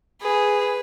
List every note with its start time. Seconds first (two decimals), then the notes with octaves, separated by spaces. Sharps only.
0.22 G#4 B4